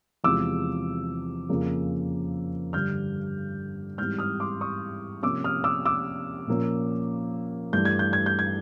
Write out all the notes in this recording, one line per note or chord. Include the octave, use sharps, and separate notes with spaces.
E2 C3 F3 G#3 D6 E6
F2 C#3 F3 A#3
G2 D3 G3 F6 G6
G#2 E3 G3 C4 F6 G6
D#6 F6
C6 D6
C#6 D#6
C3 F3 A#3 C#4 D6 E6
D#6 F6
D6 E6
D6 E6
A#2 F3 A#3 C#4
G2 E3 A3 G6
G#6
G6
G#6
G6
G#6